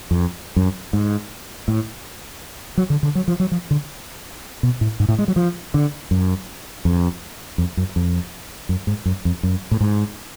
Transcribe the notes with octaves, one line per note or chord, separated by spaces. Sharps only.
F2
F#2
G#2
A2
F#3
D3
D3
F#3
F3
F#3
F3
D3
B2
A2
G#2
A2
G#3
F#3
F3
D3
F#2
F2
F2
F#2
F2
F#2
G#2
F#2
F2
F#2
A2
G#2